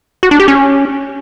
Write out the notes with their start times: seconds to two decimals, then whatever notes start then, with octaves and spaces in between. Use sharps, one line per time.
0.23 F#4
0.31 D4
0.40 G4
0.48 C#4